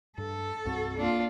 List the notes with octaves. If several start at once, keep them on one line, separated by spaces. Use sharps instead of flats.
G2 A4
C2 G2 C4 F#4
A#3 D4 F4